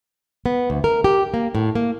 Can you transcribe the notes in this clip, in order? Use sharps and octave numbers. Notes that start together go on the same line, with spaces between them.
B3
D2
A#4
G4
A#3
A2
A#3